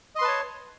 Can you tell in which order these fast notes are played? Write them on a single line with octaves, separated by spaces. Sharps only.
D#5 C6 B4 A5 C#5